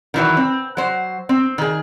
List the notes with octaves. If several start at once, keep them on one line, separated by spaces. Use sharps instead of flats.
D#3 E3 F#3
C4
F#3 C5
C4
D#3 G#4